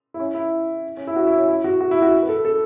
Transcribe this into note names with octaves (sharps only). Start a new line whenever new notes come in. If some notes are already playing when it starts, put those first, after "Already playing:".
E4
C#4
E4
C#4
E4
F#4
E4
C#4
E4
F#4
F#4
E4
F#4
B4
A4
A4